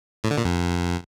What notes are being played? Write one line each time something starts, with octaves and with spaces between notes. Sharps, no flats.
A2
D3
A#2
F2